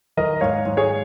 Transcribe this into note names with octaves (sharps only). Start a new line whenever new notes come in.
D#3 A#4 D#5
G#2 C#5 F5
G#2
G#4 C#5